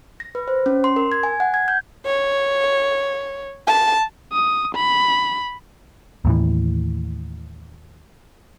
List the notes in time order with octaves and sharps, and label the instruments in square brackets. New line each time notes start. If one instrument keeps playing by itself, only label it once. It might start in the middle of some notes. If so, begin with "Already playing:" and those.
[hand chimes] A#6
B4
C5
C#4
C6
A#4
G#6
G#5
F#5
G#6
G6
[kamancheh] C#5
A5
[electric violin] D#6
B5
[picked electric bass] D#2 A2 E3